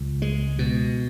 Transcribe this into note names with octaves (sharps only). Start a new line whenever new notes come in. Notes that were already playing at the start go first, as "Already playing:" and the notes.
Already playing: C#2
G#3
B2